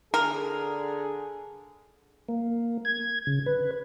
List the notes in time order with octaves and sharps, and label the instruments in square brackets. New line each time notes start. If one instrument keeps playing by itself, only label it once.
[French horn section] D3 G#4 [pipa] A#4
[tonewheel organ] A#3
G#6
C#3
B4